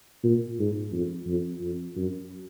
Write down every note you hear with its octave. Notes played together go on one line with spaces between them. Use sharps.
A#2
G#2
F2
F2
F2
F#2